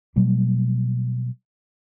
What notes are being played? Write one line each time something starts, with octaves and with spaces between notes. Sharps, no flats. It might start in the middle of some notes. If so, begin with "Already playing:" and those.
B2 F#3 G3 A#3